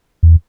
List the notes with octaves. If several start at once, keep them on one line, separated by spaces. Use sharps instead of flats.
E2